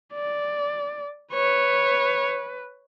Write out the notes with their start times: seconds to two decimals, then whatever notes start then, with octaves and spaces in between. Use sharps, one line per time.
0.14 D5
1.33 B4 C#5